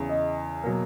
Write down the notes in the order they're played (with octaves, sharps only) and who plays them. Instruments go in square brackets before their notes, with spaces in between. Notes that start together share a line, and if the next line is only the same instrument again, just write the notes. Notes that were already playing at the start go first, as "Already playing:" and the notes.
Already playing: [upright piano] E2 C#3 E3
[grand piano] D#5
[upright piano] B2 F#3 A#3